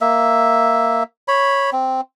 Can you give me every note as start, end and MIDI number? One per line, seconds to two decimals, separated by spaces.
0.01 1.03 58
0.01 1.03 76
1.28 1.70 73
1.28 1.70 83
1.72 2.01 60